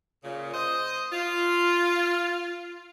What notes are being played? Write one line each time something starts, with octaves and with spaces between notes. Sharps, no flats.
A#2 C#3
C5 D#5
F4